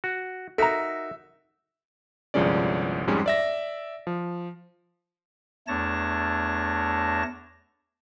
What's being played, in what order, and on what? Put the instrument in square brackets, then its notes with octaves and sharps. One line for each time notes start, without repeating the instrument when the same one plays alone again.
[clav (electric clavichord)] F#4
[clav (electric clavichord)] D#4 F#4 A#4 [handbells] A4 A#5 [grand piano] E5
[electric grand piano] G1 C2 F3 G#3 C#4 D5
F2 G#2 G3 G#3 C#4
D5 E5 A#6
F3
[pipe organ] E2 A3 D4 C#5 A5 A#6